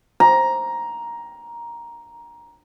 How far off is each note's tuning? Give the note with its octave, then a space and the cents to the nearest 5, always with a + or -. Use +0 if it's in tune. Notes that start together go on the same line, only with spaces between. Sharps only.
A#5 +10